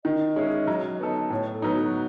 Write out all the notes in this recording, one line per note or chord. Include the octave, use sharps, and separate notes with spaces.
D#3 D#5
G#3 C#4 E4
F#3
B3 D#4 A4
A2 C#5
A4
F#3 B3 D#4
F#4